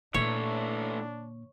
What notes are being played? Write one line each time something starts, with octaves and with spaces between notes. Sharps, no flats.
A#2 D3 E3 A3 D4 C#5